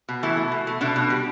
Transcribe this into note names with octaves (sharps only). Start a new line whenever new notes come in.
B2
E3 A3 E4
A3
B2
A3
B2 D4
B2
G3